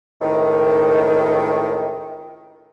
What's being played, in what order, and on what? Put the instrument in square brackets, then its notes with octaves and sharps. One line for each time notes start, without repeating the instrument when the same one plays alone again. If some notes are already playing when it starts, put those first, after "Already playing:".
[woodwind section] C#2 A2 C3 D#3